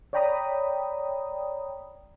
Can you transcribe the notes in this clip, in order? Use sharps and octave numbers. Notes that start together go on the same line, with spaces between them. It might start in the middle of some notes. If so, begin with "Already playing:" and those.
C#5 D5 G5 A#5 B5 D#6